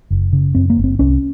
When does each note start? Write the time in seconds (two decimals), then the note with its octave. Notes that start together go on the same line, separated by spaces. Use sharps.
0.11 F#1
0.33 C#3
0.55 F#2 C4
0.70 A#3
0.77 F#1
0.84 C4
0.99 C2 C#4